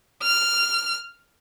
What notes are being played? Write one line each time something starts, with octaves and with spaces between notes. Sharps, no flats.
F6